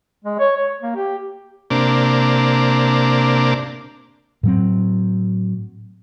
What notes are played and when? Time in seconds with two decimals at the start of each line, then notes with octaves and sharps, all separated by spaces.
0.24 G#3
0.39 C#5
0.57 C#5
0.81 A#3
0.96 G4
1.70 C3 A#3 D4
4.43 A2 F#3 C4